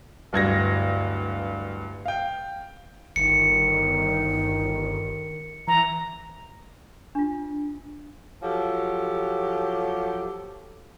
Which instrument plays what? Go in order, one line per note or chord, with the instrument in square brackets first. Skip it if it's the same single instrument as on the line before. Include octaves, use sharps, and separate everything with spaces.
[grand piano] D1 G2 G#6 A#6
F5 G5
[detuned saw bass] G1 [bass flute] D#3 [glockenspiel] C#7
[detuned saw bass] E3 [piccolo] A#5
[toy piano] D4 F4
[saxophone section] F3 F#3 G4 A4